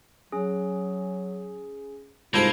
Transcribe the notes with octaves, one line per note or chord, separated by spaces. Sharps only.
F#3 C#4 G#4
C2 G#2 A#3 F4 A4 B5 G6 G#6